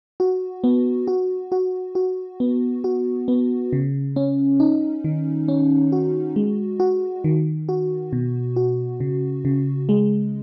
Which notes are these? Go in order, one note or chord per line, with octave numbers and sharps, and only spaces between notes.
F#4
B3
F#4
F#4
F#4
B3
F#4
B3
C#3
C#4
D#4
D#3
C#4
F#4
G#3
F#4
D#3
F#4
B2
F#4
C#3
C#3
G#3